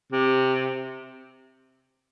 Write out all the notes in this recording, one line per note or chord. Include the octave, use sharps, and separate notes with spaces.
C3